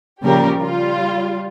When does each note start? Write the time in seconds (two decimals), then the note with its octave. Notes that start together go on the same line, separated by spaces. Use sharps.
0.24 A#2 C#3 F3 G3 G4 A#4
0.61 G3 F4